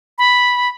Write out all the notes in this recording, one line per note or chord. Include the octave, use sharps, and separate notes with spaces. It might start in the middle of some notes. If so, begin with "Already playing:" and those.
B5